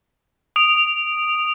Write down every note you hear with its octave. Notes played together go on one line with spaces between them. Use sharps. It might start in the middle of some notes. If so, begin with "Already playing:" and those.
D#6 D7 F7